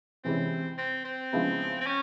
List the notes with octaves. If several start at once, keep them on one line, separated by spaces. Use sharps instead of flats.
C3 E3 G#3 C4 C#4 E4
C4
C4
C#3 F3 G#3 B3 E4
C4
C#4